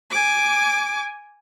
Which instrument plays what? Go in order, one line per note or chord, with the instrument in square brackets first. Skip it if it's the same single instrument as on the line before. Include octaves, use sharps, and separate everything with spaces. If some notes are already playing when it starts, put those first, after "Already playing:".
[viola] G#5 D6